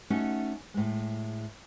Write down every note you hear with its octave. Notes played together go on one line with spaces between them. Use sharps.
A3 C#4 D#4 F#4
A2 G#3